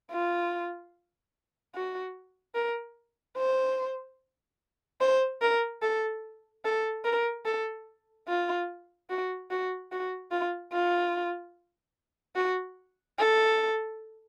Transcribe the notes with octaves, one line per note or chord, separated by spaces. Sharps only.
F4
F#4
A#4
C5
C5
A#4
A4
A4
A#4
A4
F4
F#4
F#4
F#4
F4
F4
F#4
A4